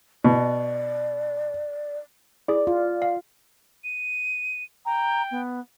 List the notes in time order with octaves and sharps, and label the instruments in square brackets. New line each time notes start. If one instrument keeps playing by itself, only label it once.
[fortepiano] B2 [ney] D5
[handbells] E4 G#4 [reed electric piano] D5
[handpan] F4
[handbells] F5
[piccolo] D#7
[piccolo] G5 [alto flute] A#5
[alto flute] B3